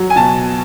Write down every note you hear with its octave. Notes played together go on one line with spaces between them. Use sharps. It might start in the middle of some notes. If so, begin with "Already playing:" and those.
Already playing: F#3
G#5
B2 A5